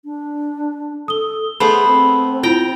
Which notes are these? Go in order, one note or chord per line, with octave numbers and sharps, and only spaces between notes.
D4
A4 D#6 G7
A3 B3 G#4 C5 B5
C4
E4 F4 G5 A#5